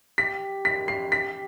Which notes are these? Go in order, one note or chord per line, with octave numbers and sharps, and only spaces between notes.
G4 B6
B6
C7
B6